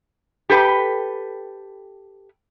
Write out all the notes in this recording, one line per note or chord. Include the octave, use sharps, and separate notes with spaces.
G4 A4 B4 G5